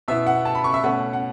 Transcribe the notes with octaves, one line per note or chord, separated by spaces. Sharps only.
B2 B3 E4 E5
F#5
A5
B5
C#6
E5
B2 A3 C#4 F#5
F#5